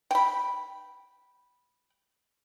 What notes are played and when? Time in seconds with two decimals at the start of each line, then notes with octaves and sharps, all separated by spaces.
0.11 G5 B5